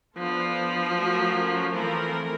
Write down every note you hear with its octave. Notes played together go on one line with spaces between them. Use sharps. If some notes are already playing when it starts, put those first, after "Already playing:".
F3 B3 D4 F4 A4 C5
F#3 A3 C#4 F#4 A#4
E3 F3 A3 C4 F4 A#4